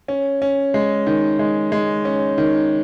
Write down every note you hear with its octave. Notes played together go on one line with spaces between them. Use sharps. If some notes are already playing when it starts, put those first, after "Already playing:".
C#4
C#4
G#3
D#3
G#3
G#3
C#4
D#3